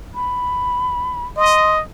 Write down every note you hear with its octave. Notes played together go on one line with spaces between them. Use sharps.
B5
D#5 C6